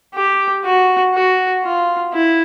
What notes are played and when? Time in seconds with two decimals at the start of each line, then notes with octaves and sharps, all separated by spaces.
0.15 G4
0.64 F#4
1.14 F#4
1.64 F4
2.13 E4